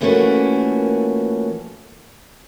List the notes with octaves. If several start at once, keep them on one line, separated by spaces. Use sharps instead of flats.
A#2 E3 A3 A#3 C#4 F#4